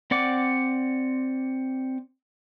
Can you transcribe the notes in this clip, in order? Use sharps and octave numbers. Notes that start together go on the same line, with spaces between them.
C4 D5 F#5 D6